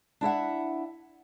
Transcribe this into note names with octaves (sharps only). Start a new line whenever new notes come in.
D4 E4 E5 F#5